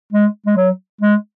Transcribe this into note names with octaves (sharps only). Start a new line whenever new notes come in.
G#3
G#3
F#3
G#3